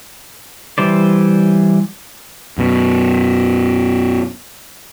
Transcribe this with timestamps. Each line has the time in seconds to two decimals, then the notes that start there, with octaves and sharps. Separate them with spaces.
0.78 E3 G3 C5 D5
2.58 F#2 B2